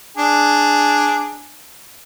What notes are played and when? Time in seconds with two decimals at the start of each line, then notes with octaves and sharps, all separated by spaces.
0.17 D4 G#4